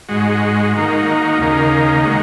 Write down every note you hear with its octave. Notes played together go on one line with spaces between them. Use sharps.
G#2 G#3 F#4
D#3 A#3 D#4 F#4
D#2 C#3 A#3 D#4
D#3 G#3 F#4